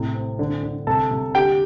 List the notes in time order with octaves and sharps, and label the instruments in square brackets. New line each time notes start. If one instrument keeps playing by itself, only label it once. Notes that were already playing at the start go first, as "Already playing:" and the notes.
Already playing: [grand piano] A2 C3
C4
D3
D3
C3 A4 A5
C3
D3 G4 G5